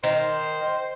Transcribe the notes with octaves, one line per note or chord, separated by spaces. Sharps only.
D#3 C5